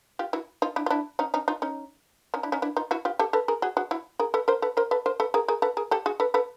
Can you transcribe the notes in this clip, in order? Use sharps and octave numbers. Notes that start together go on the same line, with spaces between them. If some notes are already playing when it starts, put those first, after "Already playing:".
F4 G4
E4 F#4
D#4 F4
D4 E4
F4
D4 E4
C#4 D#4
C#4 D#4
D#4 F4
C#4 D#4
C#4 D#4
D4 E4
C#4 D#4
D4 E4
D#4 F4
E4 F#4
F4 G4
G4 A4
A4 B4
G#4 A#4
F#4 G#4
F#4 G#4
E4 F#4
G#4 A#4
A4 B4
A#4 C5
A4 B4
A#4 C5
A4 B4
A#4 C5
A4 B4
G#4 A#4
G#4 A#4
A4 B4
G#4 A#4
G4 A4
F#4 G#4
A4 B4
A4 B4